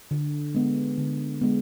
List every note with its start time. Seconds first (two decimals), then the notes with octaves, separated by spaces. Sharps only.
0.11 D3
0.55 G#3 B3
0.98 D3
1.41 G#3 B3